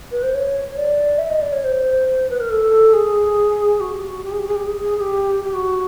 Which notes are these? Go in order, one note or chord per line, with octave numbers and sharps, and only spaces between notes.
B4
C5
C#5
D5
E5
D#5
D5
C#5
C5
B4
A#4
A4
G#4
F#4
G4
F#4
G4
G#4
G4
G#4
G4
G#4
G#4
G#4
G4
G4
F#4